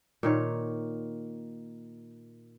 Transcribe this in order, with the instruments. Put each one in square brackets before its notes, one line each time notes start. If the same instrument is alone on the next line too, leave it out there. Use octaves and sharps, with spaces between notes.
[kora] A#2 D#3 C#5